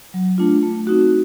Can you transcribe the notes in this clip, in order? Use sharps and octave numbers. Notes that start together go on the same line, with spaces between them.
F#3
A3 D4 F4
A3
C4 D#4 F#4